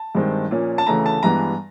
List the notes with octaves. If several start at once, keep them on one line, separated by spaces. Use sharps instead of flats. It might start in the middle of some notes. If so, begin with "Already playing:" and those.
Already playing: A5
G2 D#3 G#3 C4
A#2 F3 A#3 C#4
A5
D2 C#3 E3 A3 A#5
A5
G2 E3 G#3 B3 A#5